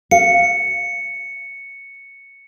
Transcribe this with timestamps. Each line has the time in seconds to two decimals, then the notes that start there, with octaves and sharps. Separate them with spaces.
0.11 F5 C#7